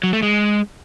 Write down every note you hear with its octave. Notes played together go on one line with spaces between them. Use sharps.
F#3
A3
G#3